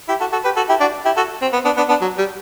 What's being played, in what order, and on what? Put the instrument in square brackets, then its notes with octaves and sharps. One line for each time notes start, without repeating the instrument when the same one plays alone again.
[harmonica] E4 G4
F#4 A4
F#4 A4
G4 B4
F#4 A4
E4 G4
D4 F#4
E4 G4
F#4 A4
C4
B3
B3 D4
B3 D4
B3 D4
F#3
G3